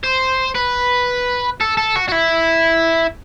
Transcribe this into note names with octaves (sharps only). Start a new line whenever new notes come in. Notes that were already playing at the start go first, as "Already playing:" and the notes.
C5
B4
A4
A4
F#4
F#4
E4